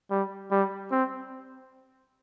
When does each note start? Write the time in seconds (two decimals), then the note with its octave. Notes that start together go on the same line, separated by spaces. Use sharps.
0.11 G3
0.51 G3
0.91 C4